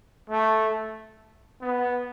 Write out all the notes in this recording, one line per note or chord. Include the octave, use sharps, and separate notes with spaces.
A3
B3